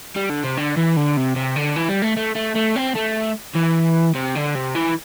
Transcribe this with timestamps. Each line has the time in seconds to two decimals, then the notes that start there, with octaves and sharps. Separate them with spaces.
0.16 G3
0.30 D3
0.44 C3
0.57 D3
0.77 E3
0.96 D3
1.17 C3
1.36 C3
1.56 D3
1.76 E3
1.89 G3
2.02 A3
2.16 A3
2.35 A3
2.55 A3
2.76 C4
2.95 A3
3.55 E3
4.15 C3
4.35 D3
4.55 C3
4.75 E3